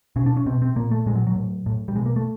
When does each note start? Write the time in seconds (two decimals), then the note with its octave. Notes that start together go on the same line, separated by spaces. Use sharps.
0.16 B2 C#4
0.26 D4
0.37 C#4
0.46 B2 C4
0.62 C4
0.76 A#2 A#3
0.91 A3
1.06 A#2 G#3
1.15 F#3
1.27 F#3
1.36 A2
1.66 A2
1.88 G3
1.96 B2 G#3
2.06 A#3
2.16 A3